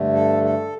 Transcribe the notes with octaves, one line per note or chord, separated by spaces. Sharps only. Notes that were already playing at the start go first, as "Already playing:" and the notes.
Already playing: G2 D3 A3
A4
A4